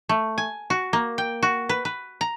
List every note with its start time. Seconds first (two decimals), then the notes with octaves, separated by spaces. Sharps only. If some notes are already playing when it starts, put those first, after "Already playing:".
0.09 A3
0.38 G#5
0.70 F#4
0.93 A#3
1.18 G5
1.43 F#4
1.69 B4
1.85 B4
2.21 A#5